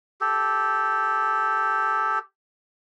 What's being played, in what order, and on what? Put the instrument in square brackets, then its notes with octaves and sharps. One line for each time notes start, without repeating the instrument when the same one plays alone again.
[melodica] G4 A4